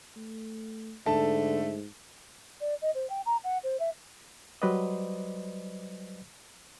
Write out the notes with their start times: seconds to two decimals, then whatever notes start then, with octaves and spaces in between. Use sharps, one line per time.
0.16 A3
1.06 G#2 D3 A3 A5
2.61 D5
2.82 D#5
2.95 C5
3.10 G5
3.26 A#5
3.44 F#5
3.63 C5
3.79 E5
4.62 F#3 G3 B4 C5 D5 D#5